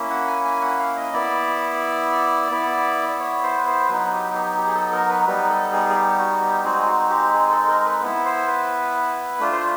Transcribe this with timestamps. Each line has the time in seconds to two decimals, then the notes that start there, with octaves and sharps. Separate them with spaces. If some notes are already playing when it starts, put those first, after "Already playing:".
Already playing: A#3 C#4 E4
0.10 F#5
0.27 G#5
0.44 G#5
0.62 F#5
0.79 F5
0.96 D#5
1.13 B3 E4 D5
2.51 B3 E4
3.08 D5
3.20 C#5
3.43 C5
3.59 B4
3.66 C5
3.89 F#3 B3 D#4 B4
4.12 G4
4.34 G4
4.58 G4
4.68 G#4
4.74 A4
4.92 A#4
5.09 B4
5.26 G3 B3 D#4 B4
5.49 A4
5.72 G#4
5.90 G#4
5.95 G4
6.19 F#4
6.41 G4
6.64 G#3 C4 D#4 F#4 G#4
6.87 F#4
7.10 G4
7.33 G#4
7.50 A4
7.67 A#4
7.85 B4
8.02 B3 E4
8.25 C5
8.47 B4
9.40 A3 D4 F4
9.52 C5